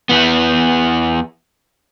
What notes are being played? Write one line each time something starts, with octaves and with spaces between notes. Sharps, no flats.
E2 E3 B3